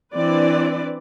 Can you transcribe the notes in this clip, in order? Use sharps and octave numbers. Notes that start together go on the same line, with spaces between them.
E3 C4 D4 B4 D5